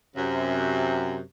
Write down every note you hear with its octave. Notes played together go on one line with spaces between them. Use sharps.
F#2 C3